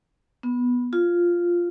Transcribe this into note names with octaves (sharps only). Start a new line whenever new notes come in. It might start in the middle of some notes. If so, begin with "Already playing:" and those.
B3
F4